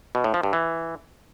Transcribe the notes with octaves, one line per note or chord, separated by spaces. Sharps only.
B2
A2
F3
G2
E3